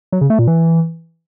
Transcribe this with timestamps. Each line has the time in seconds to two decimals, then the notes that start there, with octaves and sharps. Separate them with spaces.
0.12 F#3
0.21 C#3
0.30 A3
0.39 A#2
0.48 E3